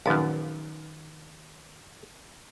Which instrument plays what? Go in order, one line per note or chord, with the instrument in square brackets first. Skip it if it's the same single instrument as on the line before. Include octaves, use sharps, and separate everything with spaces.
[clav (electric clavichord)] A#1 F#2 [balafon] D#3 D#4 F5